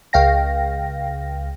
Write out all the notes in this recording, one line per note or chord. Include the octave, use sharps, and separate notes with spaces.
C#2 F5 G5 A#6